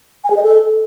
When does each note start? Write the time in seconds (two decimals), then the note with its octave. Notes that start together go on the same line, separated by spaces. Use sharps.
0.24 G#5
0.30 G#4
0.37 D#5
0.43 A4